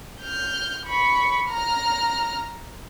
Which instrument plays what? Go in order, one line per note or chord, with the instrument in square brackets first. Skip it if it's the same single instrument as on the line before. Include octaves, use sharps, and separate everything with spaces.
[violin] F6 G6
B5 C#6
A#5 F6